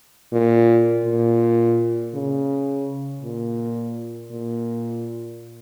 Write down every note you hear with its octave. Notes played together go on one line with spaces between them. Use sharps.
A#2
A#2
C#3
A#2
A#2